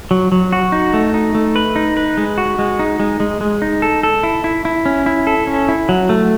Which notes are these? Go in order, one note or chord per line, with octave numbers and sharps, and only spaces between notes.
F#3
F#3
F#4
D#4
A3
D#4
A3
B4
D#4
B4
G#3
F#4
G#3
D#4
G#3
G#3
G#3
D#4
A4
A4
E4
E4
E4
C#4
E4
A4
C#4
E4
F#3
A3